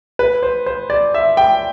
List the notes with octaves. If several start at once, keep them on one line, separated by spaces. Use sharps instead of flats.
B4
C5
C5
D5
E5
G5